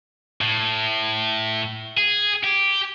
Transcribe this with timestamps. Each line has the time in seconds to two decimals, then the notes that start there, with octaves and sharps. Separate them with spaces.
0.41 A2
1.98 G#4
2.43 G4